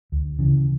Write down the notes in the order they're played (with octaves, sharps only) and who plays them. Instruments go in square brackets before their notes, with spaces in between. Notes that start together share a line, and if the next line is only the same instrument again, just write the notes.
[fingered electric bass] D2
C#3 E3